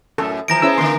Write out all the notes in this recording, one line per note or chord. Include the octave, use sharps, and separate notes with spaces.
F#2 A2 A4
D#2 E3 F3 A#5 A#6 D7
B3 C#4 E4 G#4 C5 E6
D3 A#3 C6